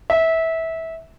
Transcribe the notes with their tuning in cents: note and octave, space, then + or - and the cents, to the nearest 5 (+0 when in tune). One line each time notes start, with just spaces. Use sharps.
E5 -20